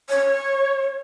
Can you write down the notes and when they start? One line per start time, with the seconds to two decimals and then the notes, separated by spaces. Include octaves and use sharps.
0.09 C#5